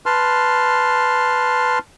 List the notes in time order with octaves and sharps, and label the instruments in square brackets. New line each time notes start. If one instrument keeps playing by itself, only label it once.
[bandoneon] B4 A5 C6 F6